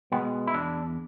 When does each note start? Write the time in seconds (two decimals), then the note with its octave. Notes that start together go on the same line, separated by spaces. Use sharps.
0.12 B2 G#3 B3
0.47 E4
0.54 E2 D4